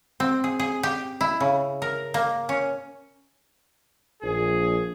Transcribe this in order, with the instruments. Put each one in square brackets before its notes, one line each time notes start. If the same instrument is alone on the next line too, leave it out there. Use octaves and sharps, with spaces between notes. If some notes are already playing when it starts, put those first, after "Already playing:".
[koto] C4
G#4
G#4
G4
E4
C#3
A#4
A#3
C#4
[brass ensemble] A#1 [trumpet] G#4